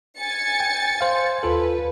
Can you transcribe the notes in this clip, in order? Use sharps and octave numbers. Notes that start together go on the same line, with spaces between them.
G#5 A6 C#7
G5
C5 F5
D#2 F4 A4 B4